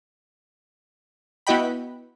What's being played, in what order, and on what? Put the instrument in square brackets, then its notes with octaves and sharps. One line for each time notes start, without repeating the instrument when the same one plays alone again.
[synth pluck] B3 E4 F#4 D#5 G5 B5